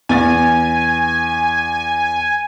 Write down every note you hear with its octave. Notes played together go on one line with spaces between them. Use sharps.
E2 G#5 A6